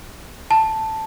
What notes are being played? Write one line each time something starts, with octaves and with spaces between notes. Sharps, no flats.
A5